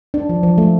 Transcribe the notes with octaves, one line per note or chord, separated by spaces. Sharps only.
D4
F3
F3
A3